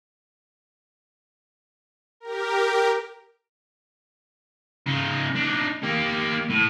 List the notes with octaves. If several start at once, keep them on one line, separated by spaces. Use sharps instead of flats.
G4 A#4
C#3 D#4
D4 D#4
A#3 G4
A2